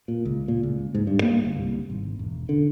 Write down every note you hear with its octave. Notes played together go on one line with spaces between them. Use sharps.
A#2
C#2
A#2
C#2
G#2
G2
A#3
G1
C2
G#1
E1
D3